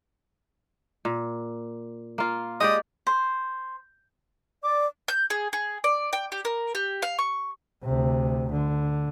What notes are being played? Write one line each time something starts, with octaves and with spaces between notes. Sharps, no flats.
A#2
A#3 F4
G#3 G4 D5 D#5
C5
D5 D6
G6
G#4
G#4
D5
G5
G4
A#4
G4
F5
C#6
D2 C3
D3